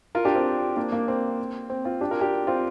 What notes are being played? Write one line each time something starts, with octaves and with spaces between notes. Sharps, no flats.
F4 A#4
D4 G4
C4 F4
A#3 D4
A#3
C4
C4
C4 F4
D4 G4
F4 A#4
D4 G4
C4 F4